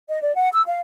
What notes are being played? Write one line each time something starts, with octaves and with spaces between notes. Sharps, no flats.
D#5
D5
F#5
E6
F5